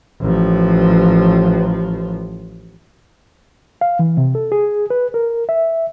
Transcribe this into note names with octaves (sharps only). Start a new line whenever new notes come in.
A1 F3
F5
E3
C3
A4
G#4
B4
A#4
E5